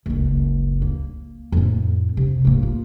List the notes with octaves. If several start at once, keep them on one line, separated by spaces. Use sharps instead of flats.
F#1 C#2
A#3
F2 A2
C3
G#2 A#3
F4